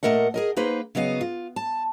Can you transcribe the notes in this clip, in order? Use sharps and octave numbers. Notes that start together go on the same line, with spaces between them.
A#2 G#3 A3 A#4 D#5 F#5
G#4 A#4 D#5
A#3 D#4 B4 C5
C#3 F#3 B3 D#5 F5
F4
A5